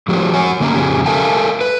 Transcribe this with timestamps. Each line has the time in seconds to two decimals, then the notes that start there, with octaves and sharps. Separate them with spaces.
0.08 A2 F3 G#3 C4 F#4 G4
0.33 F#4 C#5 F#5 G#5
0.60 D3 A#3 C#4 D#5 A#5
0.74 F2 C#3 C#4 G4
1.06 A4 A#4 E5 F5 G#5 A5
1.61 B4